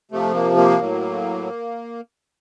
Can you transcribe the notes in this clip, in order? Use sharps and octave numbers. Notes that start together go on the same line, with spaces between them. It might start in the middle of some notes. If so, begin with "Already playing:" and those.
C3 F3 A3
A#3
A#3
A2 F#3